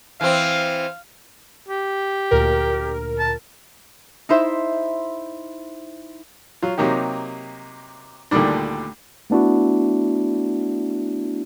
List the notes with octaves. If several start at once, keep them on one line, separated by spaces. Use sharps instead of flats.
E3 C4 F5
G4
D2 A#2 A#4
A5
D#4 E4 C5 E5
F#3 F4
C3 F#3 A#3 D#4 G4
D2 A#2 D3 D#3 G3 D4
A3 B3 D4 E4 F#4